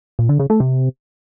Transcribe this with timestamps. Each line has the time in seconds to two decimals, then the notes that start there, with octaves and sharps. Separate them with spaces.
0.19 A#2
0.29 D3
0.39 C#3
0.50 A3
0.60 C3